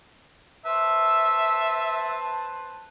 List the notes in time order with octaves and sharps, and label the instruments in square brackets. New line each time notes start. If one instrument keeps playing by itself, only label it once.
[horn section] B4 C5 A5 [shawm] E5